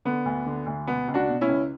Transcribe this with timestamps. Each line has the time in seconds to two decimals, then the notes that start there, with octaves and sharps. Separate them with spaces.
0.05 D3 B3
0.26 D2
0.46 D3
0.66 D2
0.87 B2 B3
1.08 C#2
1.14 D4 F#4
1.28 B2
1.41 C#4 E4
1.48 C#2